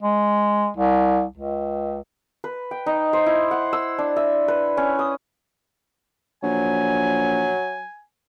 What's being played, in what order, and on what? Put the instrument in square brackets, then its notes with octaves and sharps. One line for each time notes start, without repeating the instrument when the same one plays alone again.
[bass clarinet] G#3
C2
C#2
[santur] B4
G5
D#4
C5
E4
F#5
E6
D4
E5
B4
C#4
D#6
[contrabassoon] A#1 [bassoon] F#3 [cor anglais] G#5